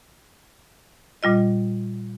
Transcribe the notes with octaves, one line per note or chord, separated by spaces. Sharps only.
A#2 G3 F4 D#5